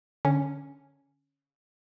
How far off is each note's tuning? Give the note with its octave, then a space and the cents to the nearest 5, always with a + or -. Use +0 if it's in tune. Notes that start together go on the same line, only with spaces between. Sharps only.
D3 +0 C#4 +0